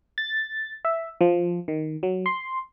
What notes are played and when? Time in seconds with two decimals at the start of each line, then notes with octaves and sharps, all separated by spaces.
0.18 A6
0.85 E5
1.21 F3
1.68 D#3
2.03 F#3
2.26 C6